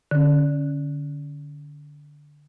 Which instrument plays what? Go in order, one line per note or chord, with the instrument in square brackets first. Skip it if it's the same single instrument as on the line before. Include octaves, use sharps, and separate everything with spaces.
[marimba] D3 C#4